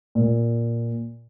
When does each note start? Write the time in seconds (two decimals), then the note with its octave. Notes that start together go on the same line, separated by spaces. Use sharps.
0.15 A#2